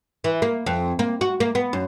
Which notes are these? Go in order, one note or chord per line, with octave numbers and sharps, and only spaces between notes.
E3
A#3
F2
A#3
F#4
A#3
B3
F#2